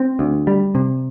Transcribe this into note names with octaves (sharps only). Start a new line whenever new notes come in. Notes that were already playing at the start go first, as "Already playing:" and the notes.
Already playing: C4
D2
G3
C3